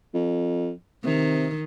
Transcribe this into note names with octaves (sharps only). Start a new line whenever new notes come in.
F2
C3 D#3